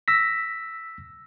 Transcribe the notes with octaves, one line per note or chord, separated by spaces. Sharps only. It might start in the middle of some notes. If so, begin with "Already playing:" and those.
E6 A#6 B6